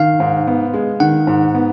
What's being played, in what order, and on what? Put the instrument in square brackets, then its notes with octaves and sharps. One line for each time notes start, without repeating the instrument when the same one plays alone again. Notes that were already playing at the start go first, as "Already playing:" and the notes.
Already playing: [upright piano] D#3 [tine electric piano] F5
[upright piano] G#2
B3
G#3
[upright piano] D#3 [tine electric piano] F#5
[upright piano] G#2
B3